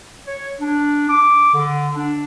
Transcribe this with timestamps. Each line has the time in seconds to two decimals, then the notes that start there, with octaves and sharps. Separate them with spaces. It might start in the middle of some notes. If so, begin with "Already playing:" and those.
0.25 C#5
0.59 D4
1.09 D6
1.54 D3
1.94 D4